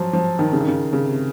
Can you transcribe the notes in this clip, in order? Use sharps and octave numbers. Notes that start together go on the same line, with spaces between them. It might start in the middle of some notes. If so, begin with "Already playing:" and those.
Already playing: F3 F#3
F3
D#3
C#3
D#3
C#3
C#3
C3